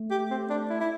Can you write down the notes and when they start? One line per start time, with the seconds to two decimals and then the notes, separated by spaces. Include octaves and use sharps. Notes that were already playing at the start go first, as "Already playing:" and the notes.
Already playing: A3
0.11 G4
0.31 C4
0.50 D4
0.70 E4
0.80 E4